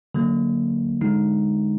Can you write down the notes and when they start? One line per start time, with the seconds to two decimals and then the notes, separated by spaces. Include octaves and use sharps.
0.14 D3 F#3 A#3
1.01 D3 G#3 D#4